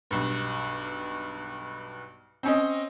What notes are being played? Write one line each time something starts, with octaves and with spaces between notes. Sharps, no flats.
B1 G2
C4 C#4 D#5